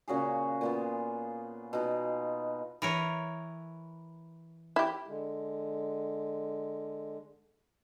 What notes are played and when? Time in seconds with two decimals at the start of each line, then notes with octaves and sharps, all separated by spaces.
0.08 A#2 C#3 F#4 G#4
0.61 A#2 B3 F4
1.73 B2 D#4 F4
2.82 E3 A#4 C#5
4.76 E4 G4
5.08 D3 G#3